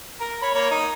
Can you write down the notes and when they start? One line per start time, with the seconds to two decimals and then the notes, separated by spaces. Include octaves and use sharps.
0.20 A#4
0.42 C#5 B5
0.54 A#3 A#4 C#5
0.71 D#4